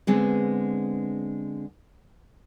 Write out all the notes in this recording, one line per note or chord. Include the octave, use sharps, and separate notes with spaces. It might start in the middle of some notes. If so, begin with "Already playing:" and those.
D3 G#3 B3 C4